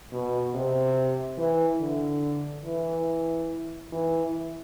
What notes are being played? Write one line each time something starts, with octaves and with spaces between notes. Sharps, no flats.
B2
C3
E3
D3
E3
E3